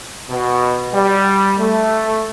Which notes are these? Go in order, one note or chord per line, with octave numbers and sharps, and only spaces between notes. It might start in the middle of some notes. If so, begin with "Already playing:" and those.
B2
G3
A3